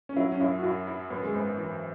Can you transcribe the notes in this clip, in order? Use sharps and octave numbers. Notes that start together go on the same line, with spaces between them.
C#4
F#3 E4
C#4
F#2 E4
F#4
F#2 E4
E4
F#2 B3
G#3
G#1 B3
E3